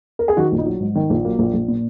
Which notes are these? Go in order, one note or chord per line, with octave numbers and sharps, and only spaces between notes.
A#4
G#4
D#3 F#4
A#1
D#4
F#3
G#2
D#3
A#1
F#3 A#3
A#1
A#1
A#2